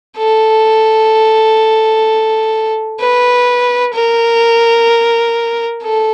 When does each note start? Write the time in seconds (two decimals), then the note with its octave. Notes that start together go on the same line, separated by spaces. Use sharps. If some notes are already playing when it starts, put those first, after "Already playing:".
0.17 A4
3.00 B4
3.94 A#4
5.82 A4